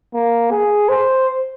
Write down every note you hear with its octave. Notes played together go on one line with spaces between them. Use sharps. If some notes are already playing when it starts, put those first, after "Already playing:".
A#3
G#4
C5